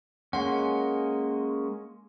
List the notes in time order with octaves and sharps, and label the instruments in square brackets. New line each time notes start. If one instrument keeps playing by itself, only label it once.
[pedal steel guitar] G#3 A#3 C#4 [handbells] F#5 C6